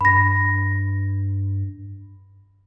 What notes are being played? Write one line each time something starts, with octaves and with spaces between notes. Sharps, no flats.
G2 B5 A#6